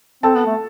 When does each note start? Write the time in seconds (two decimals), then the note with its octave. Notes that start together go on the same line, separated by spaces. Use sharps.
0.23 C4 A4 A5
0.35 B3
0.46 A3